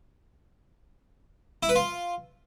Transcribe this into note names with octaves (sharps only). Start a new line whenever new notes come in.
E4
B4
F4